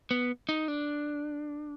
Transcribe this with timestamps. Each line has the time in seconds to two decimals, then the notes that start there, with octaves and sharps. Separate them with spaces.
0.11 B3
0.49 D#4
0.68 D4